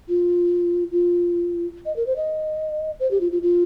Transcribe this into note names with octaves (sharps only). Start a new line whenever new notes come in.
F4
F4
D#5
A#4
C5
D#5
C5
G4
F4
F4
F4